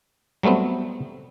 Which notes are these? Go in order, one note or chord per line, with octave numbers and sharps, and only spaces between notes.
F#3 G3 A3 B3 C4